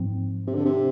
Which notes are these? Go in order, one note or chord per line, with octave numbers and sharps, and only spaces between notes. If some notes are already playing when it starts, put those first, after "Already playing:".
Already playing: G#2 F3 C4
C3
D3
C3